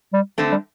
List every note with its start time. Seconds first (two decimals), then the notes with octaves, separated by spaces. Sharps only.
0.14 G3
0.38 D3 A3 C4
0.52 G3